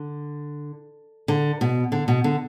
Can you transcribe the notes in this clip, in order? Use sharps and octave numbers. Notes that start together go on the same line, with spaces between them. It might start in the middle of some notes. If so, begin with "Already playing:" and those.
Already playing: D3
D3
B2
D3
B2
D3